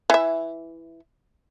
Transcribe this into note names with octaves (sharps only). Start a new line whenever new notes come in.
E3 E5